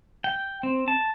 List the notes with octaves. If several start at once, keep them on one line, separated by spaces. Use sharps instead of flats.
G5
C4
A5